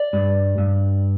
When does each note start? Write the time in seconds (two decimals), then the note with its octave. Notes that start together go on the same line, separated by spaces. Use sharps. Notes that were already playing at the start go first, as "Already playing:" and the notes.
Already playing: D5
0.13 G2
0.58 G2